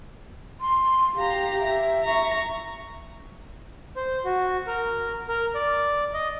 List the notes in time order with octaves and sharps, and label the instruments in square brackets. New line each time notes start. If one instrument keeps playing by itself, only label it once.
[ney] C6
[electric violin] G4 A#5 [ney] F5
[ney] E5
[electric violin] A#5 C#6
[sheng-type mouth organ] C5
F#4
A#4
A#4
D5
D#5